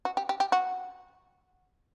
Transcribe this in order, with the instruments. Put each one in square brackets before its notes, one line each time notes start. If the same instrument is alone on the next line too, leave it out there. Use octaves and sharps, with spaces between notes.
[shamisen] F#4
G4
G4
G4
F#4